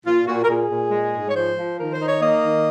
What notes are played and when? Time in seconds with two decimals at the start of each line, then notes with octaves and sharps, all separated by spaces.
0.05 A#2 F4
0.26 A#2 F#4
0.43 A#4
0.48 A#2 G#4
0.70 A#2
0.91 G#3
1.13 G#2
1.28 C#5
1.34 F3 C5
1.56 F3
1.78 D#3 A#4
1.92 C5
2.00 D#4
2.06 C#5
2.21 A#3 D#5
2.43 D#3